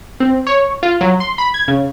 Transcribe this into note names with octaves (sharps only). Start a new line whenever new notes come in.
C4
C#5
F4
F#3
C6
B5
G#6
C#3